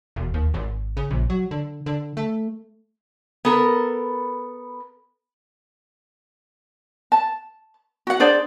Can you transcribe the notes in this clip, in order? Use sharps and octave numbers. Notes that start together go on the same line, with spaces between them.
E1
D#2
G#1
C#3
A#1
F#3
D3
D3
A3
B3 A4 A#4
A5
F#4 F#5
D4 G#4 C5 D5